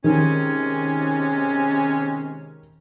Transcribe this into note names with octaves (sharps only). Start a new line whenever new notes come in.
C3 D#3 G#3 C#4